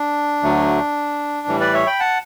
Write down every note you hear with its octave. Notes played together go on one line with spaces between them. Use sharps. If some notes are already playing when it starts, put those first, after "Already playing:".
Already playing: D4
D2 D3 F#3 A3
A2 E3 G3
B4 D5
C#5 E5
G5 B5
F#5 A5